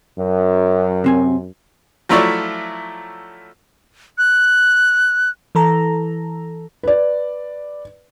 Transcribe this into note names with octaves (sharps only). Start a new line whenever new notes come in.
F#2
C3 C4 G#5
F3 F#3 A3 E4 C#5 D5
F#6
E3 A4 A#5
B4 D5